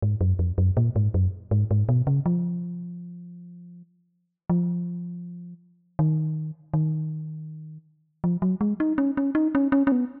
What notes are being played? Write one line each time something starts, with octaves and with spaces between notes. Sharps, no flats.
G#2
F#2
F2
F#2
A#2
G#2
F#2
G#2
G#2
B2
C#3
F3
F3
D#3
D#3
F3
F#3
G#3
D#4
C#4
C#4
D#4
C#4
C#4
C#4
B3